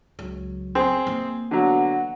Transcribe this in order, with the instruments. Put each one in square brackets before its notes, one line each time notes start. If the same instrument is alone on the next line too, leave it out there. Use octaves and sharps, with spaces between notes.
[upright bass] C#2 F#3
[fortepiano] C4 G#4
[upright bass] E3 A#3
[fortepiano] D3 F#3 [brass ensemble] B3 F#5